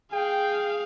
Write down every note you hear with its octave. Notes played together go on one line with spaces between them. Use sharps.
G#4 F5 G5